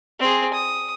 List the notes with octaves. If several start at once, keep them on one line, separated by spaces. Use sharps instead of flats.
C4 G#4
D#6